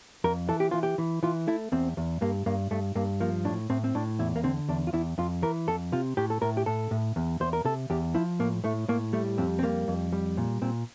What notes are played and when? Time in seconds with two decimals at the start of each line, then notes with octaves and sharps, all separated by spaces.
0.24 F2 A#4
0.49 E3 A4
0.60 G4
0.71 E3 F4
0.83 G4
0.98 E3
1.23 E3 F4
1.47 A3 E4
1.72 E2 C4
1.97 E2
2.21 G2 A#3
2.46 G2 A#3
2.71 G2 A3
2.95 G2 A#3
3.20 F3 A#3
3.45 A2 D4
3.70 A2 C4
3.84 C4
3.95 A2 D4
4.19 E2 E4
4.36 A#3
4.44 D3 C4
4.69 E2 D4
4.87 F4
4.93 E2 E4
5.18 F2 F4
5.42 E3 A#4
5.67 F2 A4
5.92 C3 F4
6.17 A2 G4
6.30 A4
6.42 A2 A#4
6.57 G4
6.66 A2 A4
6.91 A2
7.16 E2
7.40 E2 C5
7.53 A#4
7.65 C3 A4
7.90 E2 G4
8.15 F3 E4
8.39 A2 A#3
8.64 A2 A3
8.88 A2 A#3
9.13 G3 A3
9.38 F2 C4
9.59 C4
9.63 G3 A#3
9.88 F2
10.13 G3
10.37 A#2
10.62 A#2 C4